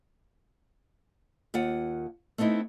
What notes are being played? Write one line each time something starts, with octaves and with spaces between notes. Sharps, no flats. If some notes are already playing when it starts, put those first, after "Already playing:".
D#2 F4 F#5
A3 B3 C4 D#4 E4